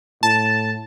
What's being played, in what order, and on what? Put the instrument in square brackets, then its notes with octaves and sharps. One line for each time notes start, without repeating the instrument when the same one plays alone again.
[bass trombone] A2 [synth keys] A5